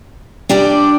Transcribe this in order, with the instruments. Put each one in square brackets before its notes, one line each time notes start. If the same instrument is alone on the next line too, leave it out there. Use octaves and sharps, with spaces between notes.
[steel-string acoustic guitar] G3 D4 G4 D5